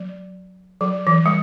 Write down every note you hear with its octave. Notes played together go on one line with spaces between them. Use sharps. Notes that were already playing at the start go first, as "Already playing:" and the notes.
Already playing: F#3
F#3
E3
G3